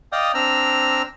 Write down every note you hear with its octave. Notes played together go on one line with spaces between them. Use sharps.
D5 D#5 F5 G5 D#6
C4 D4 A#5 E6 F6